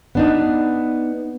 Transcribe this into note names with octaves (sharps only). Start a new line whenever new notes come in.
B3 D4 D#4